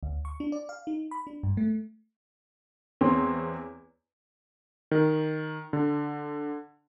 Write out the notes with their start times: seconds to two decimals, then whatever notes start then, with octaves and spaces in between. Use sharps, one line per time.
0.03 D2
0.25 C#6
0.40 D4
0.52 D5
0.69 F5
0.87 D#4
1.11 B5
1.27 D4
1.43 G2
1.57 A3
3.01 E2 C4 C#5
4.91 D#3
5.73 D3